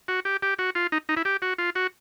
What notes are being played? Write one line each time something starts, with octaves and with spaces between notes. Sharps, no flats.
F#4
G4
G4
F#4
F4
D#4
D#4
E4
G4
F#4
F4
F#4